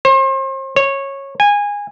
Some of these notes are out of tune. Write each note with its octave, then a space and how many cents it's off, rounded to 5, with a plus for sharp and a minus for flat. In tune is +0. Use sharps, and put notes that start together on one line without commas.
C5 +40
C#5 -15
G#5 -20